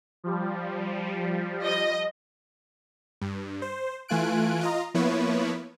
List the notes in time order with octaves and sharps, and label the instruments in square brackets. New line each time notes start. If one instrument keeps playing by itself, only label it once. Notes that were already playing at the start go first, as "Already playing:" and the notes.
[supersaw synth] F3 G3
[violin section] D#5
[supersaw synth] G2
C5
E3 A3 F4 G#5 F#6 D7
F4 D#5 A#5
F3 A#3 B3 E4 B4 C#5